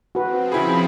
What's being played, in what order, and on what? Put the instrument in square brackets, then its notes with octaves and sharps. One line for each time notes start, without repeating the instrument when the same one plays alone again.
[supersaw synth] F3 C4 [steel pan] F#4 B4
[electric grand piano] C#3 E4 G#4 [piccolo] B5